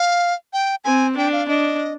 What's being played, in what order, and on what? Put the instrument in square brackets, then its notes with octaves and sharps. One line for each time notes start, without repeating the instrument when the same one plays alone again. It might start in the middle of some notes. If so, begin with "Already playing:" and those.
Already playing: [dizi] F5
G5
[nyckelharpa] C4 [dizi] G#5
[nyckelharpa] D4 [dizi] G5
[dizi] F5
[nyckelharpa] D4 [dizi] D#5